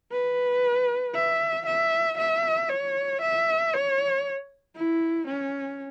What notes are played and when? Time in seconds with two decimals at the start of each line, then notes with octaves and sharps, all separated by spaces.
0.12 B4
1.15 E5
1.67 E5
2.18 E5
2.69 C#5
3.22 E5
3.73 C#5
4.76 E4
5.28 C#4